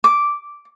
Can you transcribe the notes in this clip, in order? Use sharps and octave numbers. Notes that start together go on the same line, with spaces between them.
D6